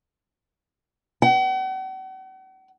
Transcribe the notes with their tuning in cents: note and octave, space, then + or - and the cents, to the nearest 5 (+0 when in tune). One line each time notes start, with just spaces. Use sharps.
F#5 +45